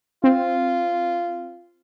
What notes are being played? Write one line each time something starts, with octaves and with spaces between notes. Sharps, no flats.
C4 F4